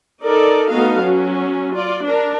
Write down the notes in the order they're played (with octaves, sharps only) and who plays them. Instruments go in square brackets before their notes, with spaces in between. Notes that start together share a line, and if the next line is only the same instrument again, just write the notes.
[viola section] D#4 A4 A#4 D5
A3 B3 D#4 F#4 A4 F5
F#3 C#4
F4 D5
D4 A#4